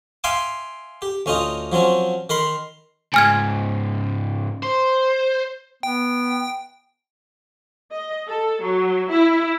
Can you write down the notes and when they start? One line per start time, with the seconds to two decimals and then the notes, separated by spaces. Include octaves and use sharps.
0.24 E5 F5 G5 G#5 C6 D6
1.02 G4
1.26 D2 C#4 D#4 F4 D#5
1.72 F3 F#3 C4 C#4
2.30 D#3 A#4 B5 C6
3.14 G#2 C#3 G#5 F6 G#6
4.63 C5
5.83 B3 G5
7.91 D#5
8.27 A4
8.62 F#3
9.10 E4